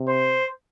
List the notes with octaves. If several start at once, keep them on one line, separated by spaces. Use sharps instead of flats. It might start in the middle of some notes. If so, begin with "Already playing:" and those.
Already playing: C3
C5